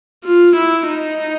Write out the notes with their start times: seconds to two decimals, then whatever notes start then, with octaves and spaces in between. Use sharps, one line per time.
0.24 F4
0.56 E4
0.88 D#4